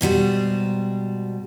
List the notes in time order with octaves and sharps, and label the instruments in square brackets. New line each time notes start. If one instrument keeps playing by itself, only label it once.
[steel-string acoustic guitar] G#2 B2 G3 C5